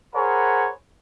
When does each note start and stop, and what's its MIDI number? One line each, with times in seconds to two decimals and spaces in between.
0.15 0.69 68
0.15 0.69 70
0.15 0.69 72
0.15 0.69 73
0.15 0.69 78
0.15 0.69 83